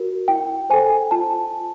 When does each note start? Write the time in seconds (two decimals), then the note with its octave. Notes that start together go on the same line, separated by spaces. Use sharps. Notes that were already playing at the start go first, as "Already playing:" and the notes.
Already playing: F#4 A#4
0.28 E4 G5
0.70 A4 C5 G#5
1.11 F4 A5